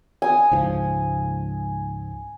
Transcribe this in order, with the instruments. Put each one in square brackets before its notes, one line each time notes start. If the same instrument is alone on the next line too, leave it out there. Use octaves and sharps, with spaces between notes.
[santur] G#5 D#6
[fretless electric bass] C#2 G#2 F3